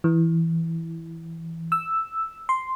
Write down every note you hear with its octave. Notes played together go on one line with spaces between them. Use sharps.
E3
E6
C6